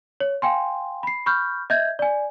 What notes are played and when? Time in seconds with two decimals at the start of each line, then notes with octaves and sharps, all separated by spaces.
0.20 C#5
0.42 F5 G5 G#5 C6
1.03 B5 C7
1.26 B5 C#6 F6 G6
1.70 D#5 E5 G6 G#6
1.99 D5 G#5